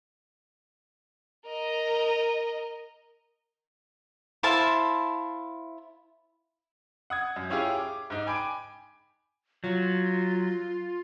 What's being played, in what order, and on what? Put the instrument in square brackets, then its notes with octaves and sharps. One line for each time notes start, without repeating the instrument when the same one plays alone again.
[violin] A#4 D#5
[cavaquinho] E4 C5 F5 A5
[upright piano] F#5 D#6 G#6
F#2
C#4 E4 F4 G4 G#4 C#5
D6
G#2 D#4
G5 G#5 B5 D6 D7
[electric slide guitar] F#3 [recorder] F4